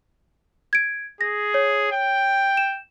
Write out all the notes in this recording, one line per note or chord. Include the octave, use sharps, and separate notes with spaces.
G#6 D7
G#4 A#6
C#5
G5
E7